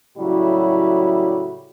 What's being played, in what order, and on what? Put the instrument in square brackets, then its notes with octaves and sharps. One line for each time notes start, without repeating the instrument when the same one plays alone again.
[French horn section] A2 C#3 F#3 G3 E4 F#4